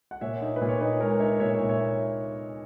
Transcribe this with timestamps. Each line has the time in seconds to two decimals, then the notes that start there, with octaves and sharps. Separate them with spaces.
0.11 F#5
0.21 A#2 C#5 E5
0.41 D#4
0.56 B4
0.61 A#2
0.69 C#5
0.80 D#4 B4 D#5
1.00 G#3 A#4 C#5
1.20 D#4 C#5 E5
1.40 A#2 C#5 E5
1.54 C#5 E5
1.60 A#2
1.69 C#5 E5